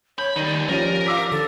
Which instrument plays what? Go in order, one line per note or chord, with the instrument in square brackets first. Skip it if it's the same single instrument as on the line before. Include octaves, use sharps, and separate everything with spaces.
[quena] C#5 [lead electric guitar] B5 [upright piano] G6
[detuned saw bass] D#3 [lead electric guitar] G3 D#4 [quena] D5 [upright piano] D#7
[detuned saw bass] F3 [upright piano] C#4 G4 D#7 [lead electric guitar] A#4
[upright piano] F5 E6 B6 [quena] D6
[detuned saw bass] D3 [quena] A4